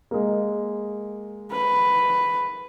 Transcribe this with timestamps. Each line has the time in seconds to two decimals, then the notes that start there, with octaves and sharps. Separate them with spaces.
0.11 G#3 A#3
1.51 B4